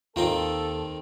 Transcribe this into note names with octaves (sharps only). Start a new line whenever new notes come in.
D#2 D#3 C4 D#4 F4 A4 A#5